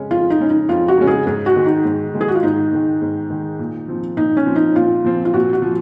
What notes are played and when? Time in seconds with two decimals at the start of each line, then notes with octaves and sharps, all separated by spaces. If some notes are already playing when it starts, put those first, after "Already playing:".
Already playing: F2 C#3 G#3 C#4
0.10 F2 F4
0.30 D#4
0.40 C#3 G#3 C#4
0.50 D#4
0.69 F2 F4
0.88 F#4
0.98 C#3 G#3 C#4
1.07 G#4
1.27 G#2 G#4
1.46 F#4
1.56 D#3 G#3
1.66 D#4
1.85 G#2
2.14 D#3 G#3
2.21 G#4
2.28 F#4
2.35 F4
2.43 G#2 D#4
2.72 D#3 G#3
3.02 G#2
3.30 D#3 G#3
3.59 A#2
3.88 F3 C4
4.17 A#2 D#4
4.37 C#4
4.46 F3 C4
4.56 D#4
4.75 A#2 F4
5.04 F3 C4
5.25 F4
5.33 A#2 F#4
5.53 F#4
5.62 F3